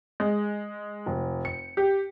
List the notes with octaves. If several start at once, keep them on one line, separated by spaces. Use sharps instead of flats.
G#3
F1
C#7
G4